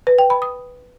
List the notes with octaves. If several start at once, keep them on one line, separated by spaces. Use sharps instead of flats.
B4
G5
B5
D#6